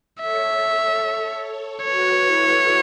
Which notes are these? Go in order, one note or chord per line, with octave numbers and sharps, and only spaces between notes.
A4 C#5 E5
F#4 B4 C#5
E4 A4